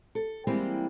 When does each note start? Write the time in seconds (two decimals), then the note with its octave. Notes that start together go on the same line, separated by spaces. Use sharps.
0.15 A4
0.47 E3 G3 G#3 A#3 C4 E4